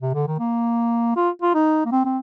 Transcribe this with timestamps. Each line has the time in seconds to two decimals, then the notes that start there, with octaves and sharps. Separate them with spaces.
0.01 C3
0.14 D3
0.27 D#3
0.39 A#3
1.16 F4
1.42 F4
1.54 D#4
1.85 A#3
1.92 C4
2.05 C4